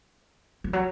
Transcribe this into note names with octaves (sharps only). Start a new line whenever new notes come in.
F3
F#3